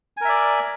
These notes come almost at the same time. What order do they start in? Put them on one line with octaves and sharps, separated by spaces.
G#5 A#4 E5 D5